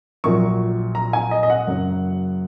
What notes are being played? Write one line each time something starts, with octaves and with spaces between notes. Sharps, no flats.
A#1 A#2 F#3 C#6
A#5
G#5
D#5
D#5
F#5
F#1 F#2 F#3